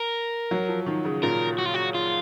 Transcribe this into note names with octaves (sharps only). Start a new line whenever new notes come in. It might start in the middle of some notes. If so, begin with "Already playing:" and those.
Already playing: A#4
F#3
F3
D#3
C#3
A#2 A#4
F#4
F4
F#4
F4